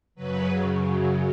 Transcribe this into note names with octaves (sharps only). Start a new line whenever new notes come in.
F#2 C#3 F#3 B4